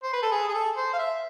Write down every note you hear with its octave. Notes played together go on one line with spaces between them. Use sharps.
C5
B4
A4
G#4
G#4
A4
C5
F5
E5